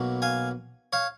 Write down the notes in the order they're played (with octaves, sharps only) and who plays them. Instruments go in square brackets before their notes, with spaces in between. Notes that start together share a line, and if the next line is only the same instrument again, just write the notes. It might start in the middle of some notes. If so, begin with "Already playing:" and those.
Already playing: [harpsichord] B1 B2 F#3 A#3
F5 G#5
C#5 F5